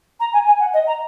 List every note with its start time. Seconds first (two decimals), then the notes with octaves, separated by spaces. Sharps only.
0.20 A#5
0.33 G#5
0.46 G#5
0.59 F#5
0.74 D#5
0.87 A#5